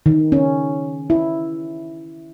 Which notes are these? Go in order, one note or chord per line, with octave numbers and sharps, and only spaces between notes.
D#3
C#4
E4